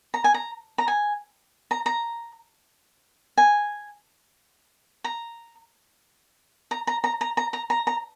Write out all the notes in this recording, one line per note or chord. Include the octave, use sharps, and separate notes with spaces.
A#5
G#5
A#5
A#5
G#5
A#5
A#5
G#5
A#5
A#5
A#5
A#5
A#5
A#5
A#5
A#5
A#5